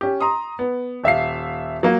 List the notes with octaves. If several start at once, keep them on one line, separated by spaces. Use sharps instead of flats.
C#4 G4
A#5 C6 D#6
B3
D#1 E5 F5 C7
F#3 A#3